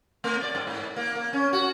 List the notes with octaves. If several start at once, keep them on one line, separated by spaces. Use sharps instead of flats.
A3
D5
G2
G#2
A#3
A#3
C#4
F#4